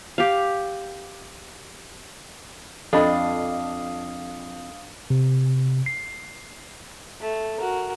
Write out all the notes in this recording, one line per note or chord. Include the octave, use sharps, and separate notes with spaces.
G4 F5
F2 D4 A4 D#5 F5 B5 D#6
C3
C7
A3
F#4 A#4